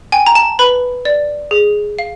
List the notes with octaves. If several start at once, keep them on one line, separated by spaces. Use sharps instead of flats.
G5 G#5
A#5
A5
B4 B5
D5
G#4
F5